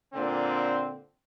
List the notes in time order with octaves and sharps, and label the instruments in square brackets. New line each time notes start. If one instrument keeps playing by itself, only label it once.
[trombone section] A#2 D3 C4